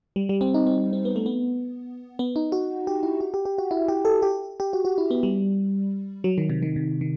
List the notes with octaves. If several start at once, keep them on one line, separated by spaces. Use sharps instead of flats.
G3
G3
C4
D#4
C4
C4
B3
A3
B3
B3
D#4
F#4
G4
E4
F#4
G4
G4
F#4
E4
G4
A4
G4
G4
F#4
F#4
E4
B3
G3
F#3
D#3
C3
D#3
C3
D#3